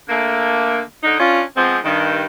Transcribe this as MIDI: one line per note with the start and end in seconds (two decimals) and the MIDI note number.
0.09 0.81 50
0.09 0.81 57
0.09 0.81 58
1.04 1.17 50
1.04 1.17 63
1.19 1.42 61
1.19 1.42 62
1.19 1.42 65
1.56 1.78 53
1.56 1.78 56
1.56 1.78 59
1.56 1.78 60
1.84 2.25 43
1.84 2.25 51